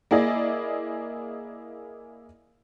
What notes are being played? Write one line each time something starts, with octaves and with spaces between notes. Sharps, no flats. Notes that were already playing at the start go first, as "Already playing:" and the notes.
A#3 E4 G#4 D5 D#5